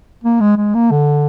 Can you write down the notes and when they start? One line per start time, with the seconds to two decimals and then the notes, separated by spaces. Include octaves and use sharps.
0.24 A#3
0.40 G#3
0.57 G#3
0.75 A#3
0.91 D3